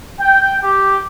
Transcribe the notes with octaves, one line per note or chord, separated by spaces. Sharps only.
G5
G4